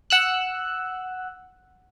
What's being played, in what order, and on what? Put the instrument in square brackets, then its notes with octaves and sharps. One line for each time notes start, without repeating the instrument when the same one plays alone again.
[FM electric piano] F#5 E6 F#6